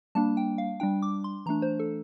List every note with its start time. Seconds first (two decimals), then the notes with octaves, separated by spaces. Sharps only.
0.15 G3 A#3 D4 A5
0.37 G5
0.58 F5
0.80 G3 D4 G5
1.02 D6
1.24 C6
1.46 E3 A3 D4 A#5
1.62 C5
1.80 A4